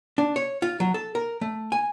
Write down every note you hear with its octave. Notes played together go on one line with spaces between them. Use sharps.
D4
C#5
F4
F#3
A4
A#4
A3
G#5